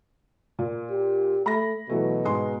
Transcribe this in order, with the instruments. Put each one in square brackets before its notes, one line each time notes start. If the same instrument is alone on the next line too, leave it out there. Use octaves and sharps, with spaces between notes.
[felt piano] A#2
[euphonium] G4
[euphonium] A3 [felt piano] B5 A#6
[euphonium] B2 [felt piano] E3 F#3 A3
[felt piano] G#2 G#3 C6